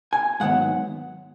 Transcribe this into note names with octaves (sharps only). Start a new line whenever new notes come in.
G#5
G#2 D#3 F#3 B3 F#5